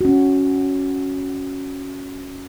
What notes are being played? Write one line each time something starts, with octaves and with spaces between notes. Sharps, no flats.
C#4 F#4